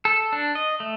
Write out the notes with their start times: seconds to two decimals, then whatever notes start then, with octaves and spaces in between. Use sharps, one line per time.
0.05 A4
0.33 D4
0.55 D#5
0.80 A3